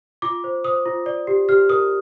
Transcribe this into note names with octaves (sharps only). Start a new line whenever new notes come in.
F4 D6
C5
C5 D#6
F4
D5
G4
G4 F6
A#4 D#6